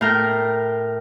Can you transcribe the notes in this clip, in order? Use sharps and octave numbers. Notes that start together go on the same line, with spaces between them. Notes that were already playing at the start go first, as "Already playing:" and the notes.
A2 A#4 G5